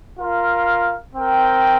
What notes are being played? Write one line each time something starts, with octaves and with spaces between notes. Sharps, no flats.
F4 A#4 F5
C4 A#4 G5